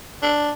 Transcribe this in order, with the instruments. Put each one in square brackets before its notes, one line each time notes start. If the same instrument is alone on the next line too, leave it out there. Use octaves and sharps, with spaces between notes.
[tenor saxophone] D4